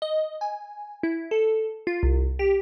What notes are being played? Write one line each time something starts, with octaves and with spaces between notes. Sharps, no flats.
D#5
G#5
E4
A4
F4
C2
G4